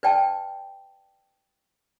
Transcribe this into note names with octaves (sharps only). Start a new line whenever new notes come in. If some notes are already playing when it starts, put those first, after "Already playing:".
B4 D5 G5 A5